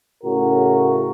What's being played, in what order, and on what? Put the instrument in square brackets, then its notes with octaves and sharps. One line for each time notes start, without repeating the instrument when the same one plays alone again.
[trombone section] A2 C#3 F#4 A#4